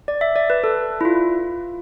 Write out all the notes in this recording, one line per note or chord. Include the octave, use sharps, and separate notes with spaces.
D5
E5
D5
B4
A4
E4
F4